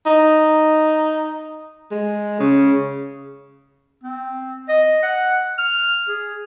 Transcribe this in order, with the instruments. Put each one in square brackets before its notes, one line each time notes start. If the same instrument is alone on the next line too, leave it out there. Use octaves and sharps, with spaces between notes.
[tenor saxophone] D#4
G#3
C#3
[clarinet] C4
D#5
F#5
F6
G#4